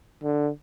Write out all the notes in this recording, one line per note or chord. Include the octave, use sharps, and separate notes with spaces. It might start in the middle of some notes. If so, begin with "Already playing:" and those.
D3